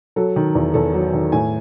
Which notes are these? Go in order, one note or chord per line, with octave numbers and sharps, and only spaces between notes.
F#3 A4
D#3
E2
E2 A4
F#3
D#3
A2 G#5